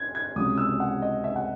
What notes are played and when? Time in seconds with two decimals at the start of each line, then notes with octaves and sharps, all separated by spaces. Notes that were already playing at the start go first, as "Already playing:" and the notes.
Already playing: G#6
0.15 G#6
0.36 C#2 C3 F#3 D#6
0.58 E6
0.80 F#5
1.02 D#5
1.24 E5
1.36 F#5